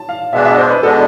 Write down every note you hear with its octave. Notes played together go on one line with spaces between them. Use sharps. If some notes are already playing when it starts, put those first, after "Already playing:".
Already playing: A5
F5
B2 G#3 B3 D4 E5
E5
C5
B4
B2 G#3 B3 D4 A4